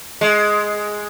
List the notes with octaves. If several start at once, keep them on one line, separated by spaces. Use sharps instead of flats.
G#3